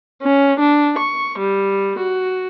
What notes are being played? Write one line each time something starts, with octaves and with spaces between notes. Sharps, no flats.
C#4
D4
C#6
G3
F#4